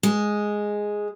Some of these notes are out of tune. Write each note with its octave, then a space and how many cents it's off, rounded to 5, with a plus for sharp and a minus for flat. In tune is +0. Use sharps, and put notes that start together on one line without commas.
G#3 +0